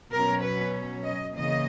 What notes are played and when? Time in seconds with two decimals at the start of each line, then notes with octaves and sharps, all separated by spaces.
0.12 B2 F#3 C#4 A#4
0.42 B4
1.04 D#5
1.34 C#3 E3 A#3 D#5